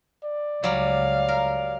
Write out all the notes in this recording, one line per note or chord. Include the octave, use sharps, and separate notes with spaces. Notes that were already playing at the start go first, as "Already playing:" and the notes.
D5
C#2 F#3 G3 F5
A#4